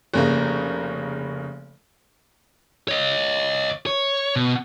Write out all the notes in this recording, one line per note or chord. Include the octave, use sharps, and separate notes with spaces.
F1 C#3 A#3
C#5 D#5
C#5
B2